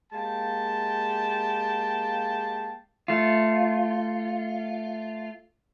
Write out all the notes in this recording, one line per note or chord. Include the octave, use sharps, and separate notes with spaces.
G#3 A#3 G4 F5 G5 A5
A3 F4